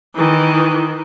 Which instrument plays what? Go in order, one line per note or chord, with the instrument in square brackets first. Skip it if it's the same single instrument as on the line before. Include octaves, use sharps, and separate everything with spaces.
[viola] D#3 E3